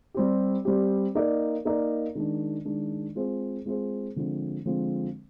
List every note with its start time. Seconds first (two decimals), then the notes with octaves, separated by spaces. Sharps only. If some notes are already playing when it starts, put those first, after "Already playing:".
0.14 G3 C4 G4
0.65 G3 C4 G4
1.15 A#3 D#4 A#4 D5
1.65 A#3 D#4 A#4 D5
2.15 D#3 G#3 D4
2.65 D#3 G#3 D4
3.15 G#3 C4 F4 G#4 C5
3.65 G#3 C4 F4 G#4 C5
4.16 D3 F3 G#3 C4
4.66 D3 F3 G#3 C4